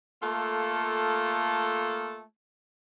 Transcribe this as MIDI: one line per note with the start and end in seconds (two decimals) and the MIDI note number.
0.23 2.24 57
0.23 2.24 58
0.23 2.24 65
0.23 2.24 69